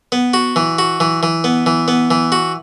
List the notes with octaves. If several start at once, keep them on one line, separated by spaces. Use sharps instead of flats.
B3
F#4
E3
F#4
E3
E3
B3
E3
B3
E3
F#4